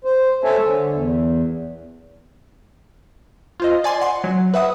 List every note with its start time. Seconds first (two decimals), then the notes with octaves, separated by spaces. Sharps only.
0.05 C5
0.44 A4 C5 C#5 E5 G#5 A5
0.64 D3
0.93 E2
3.60 F4 C5 D#5
3.84 D5 G#5 C6
4.01 F#5 C6
4.24 F#3
4.54 B4 E5 F#5 D#6